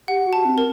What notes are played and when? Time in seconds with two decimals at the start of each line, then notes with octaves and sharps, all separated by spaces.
0.08 G4 F#5
0.27 F#4
0.33 A5
0.45 C4
0.58 A#4